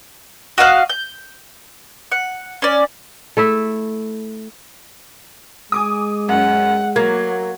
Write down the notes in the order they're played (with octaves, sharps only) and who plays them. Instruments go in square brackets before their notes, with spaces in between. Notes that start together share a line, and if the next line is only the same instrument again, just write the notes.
[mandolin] F#4 D#5 F5 F#6
G6
F#5
C#4 D5
[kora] A3 E4 E5
[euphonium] G#3 [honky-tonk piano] G#5 D6 D#6
[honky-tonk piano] F#2 C#4 [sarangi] F#5
[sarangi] F#3 [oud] A#3 [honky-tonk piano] G#6